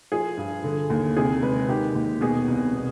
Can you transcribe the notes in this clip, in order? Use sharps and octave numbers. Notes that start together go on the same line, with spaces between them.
F3 G#4
G2
D3
D#2
C3 G#4
G#3 B4
D#3 G4
D#2
B2 G#4
C2
B2